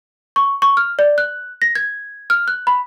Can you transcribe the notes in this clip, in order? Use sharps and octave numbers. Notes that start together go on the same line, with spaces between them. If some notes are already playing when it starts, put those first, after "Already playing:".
C#6
C#6
F6
D5
F#6
A#6
G#6
F6
F#6
B5